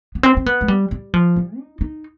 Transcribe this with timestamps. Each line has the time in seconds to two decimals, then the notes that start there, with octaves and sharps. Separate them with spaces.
0.15 B3
0.23 C4
0.37 C4
0.46 B3
0.61 G#3
0.68 G3
0.91 G3
1.14 F3
1.36 G3
1.59 D#4
1.81 D#4